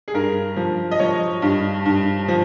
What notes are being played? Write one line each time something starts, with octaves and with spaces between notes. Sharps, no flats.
G#4
G2 A#4
F3
D#5
F3 C#5
G2
G2
F3